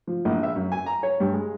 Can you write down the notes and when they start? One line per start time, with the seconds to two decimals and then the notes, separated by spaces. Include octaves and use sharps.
0.07 F3
0.25 A#1
0.43 E5
0.55 F#2
0.72 G#5
0.86 A#5
1.03 C#5
1.20 G2
1.33 G#3